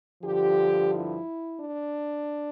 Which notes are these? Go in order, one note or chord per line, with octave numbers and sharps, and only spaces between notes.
G2 D3 F3 G4
E4
D4